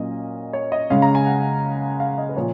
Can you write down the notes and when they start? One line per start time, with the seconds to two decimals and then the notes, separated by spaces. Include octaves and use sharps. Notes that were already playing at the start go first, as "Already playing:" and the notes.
Already playing: A#2 F#3 A#3 C#4 D#5
0.53 C#5
0.72 D#5
0.90 C#3 G#3 C#4 F5
1.02 A#5
1.15 G#5
1.26 F#5
2.00 F5
2.18 D#5
2.29 B4
2.36 A#2 F3 C#5